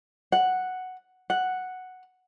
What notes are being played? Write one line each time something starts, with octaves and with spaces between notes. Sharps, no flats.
F#5
F#5